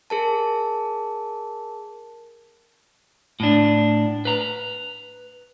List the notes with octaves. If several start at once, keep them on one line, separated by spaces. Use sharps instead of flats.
G#4 A#4 A5
A2 D4
B4 A#5